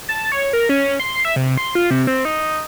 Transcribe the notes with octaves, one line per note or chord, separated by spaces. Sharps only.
A5
C#5
A#4
C#4
C6
E5
C3
C6
F4
C3
C4
D#4